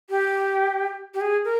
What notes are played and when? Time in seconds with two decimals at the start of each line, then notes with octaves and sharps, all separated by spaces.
0.10 G4
1.14 G4
1.21 G#4
1.45 A#4